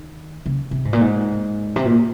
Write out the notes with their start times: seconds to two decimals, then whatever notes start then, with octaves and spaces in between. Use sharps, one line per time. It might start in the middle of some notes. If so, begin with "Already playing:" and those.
Already playing: D#3
0.46 C#3
0.71 C3
0.85 G#2
0.93 A#2
1.01 G#2
1.76 C3
1.85 A#2